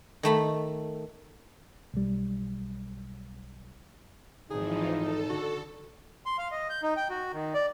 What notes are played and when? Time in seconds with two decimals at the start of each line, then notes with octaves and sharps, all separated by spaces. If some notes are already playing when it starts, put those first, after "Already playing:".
0.23 D#3 A3 B5
1.94 B1 G3
4.51 G#1 E3 F3 D#4 G#4
4.92 A4
5.30 D3 F#4
6.26 C6
6.38 F5
6.52 D#5
6.70 G6
6.83 D#4
6.97 G5
7.10 F#4
7.33 D#3
7.54 D5